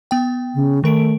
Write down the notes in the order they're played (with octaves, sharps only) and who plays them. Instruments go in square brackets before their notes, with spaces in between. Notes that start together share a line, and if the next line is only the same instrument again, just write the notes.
[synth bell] B3 G5
[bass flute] C#3
[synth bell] D#3 A#4 D7 [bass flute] A3